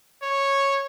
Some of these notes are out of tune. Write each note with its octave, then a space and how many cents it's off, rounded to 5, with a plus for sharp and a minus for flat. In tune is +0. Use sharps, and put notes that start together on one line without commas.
C#5 -5